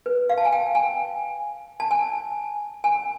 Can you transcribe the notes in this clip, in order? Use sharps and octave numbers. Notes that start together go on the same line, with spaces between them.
B4
F5
A5
G#5
G5
G#5
A5
G#5
G#5